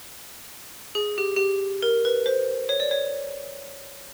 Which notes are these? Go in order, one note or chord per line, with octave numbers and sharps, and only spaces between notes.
G#4
G4
G4
A#4
B4
C5
C#5
D5
C#5